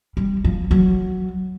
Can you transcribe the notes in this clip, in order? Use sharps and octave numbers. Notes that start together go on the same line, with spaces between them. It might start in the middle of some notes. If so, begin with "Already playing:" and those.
G3
F3
F#3